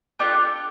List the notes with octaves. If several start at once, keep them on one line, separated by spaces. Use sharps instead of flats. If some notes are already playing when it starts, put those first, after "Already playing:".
D4 F4 G4 A4 G5